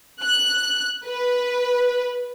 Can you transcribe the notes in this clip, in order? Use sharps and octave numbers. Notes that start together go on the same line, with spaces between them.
F#6
B4